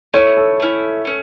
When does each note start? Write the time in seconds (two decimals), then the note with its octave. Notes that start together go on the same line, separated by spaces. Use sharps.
0.14 A3 C#4 E4 C#5
0.37 A4
0.60 A3 C#4 E4
1.05 A3 C#4